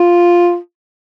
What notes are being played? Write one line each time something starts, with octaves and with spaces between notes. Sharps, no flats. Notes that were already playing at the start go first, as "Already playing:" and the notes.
Already playing: F4